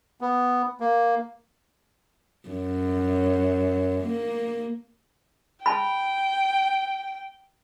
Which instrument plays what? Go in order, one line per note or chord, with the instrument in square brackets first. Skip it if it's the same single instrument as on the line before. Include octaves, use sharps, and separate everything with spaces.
[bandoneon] B3
A#3
[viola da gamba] F#2
A#3
[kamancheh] G5 [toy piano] A5 B5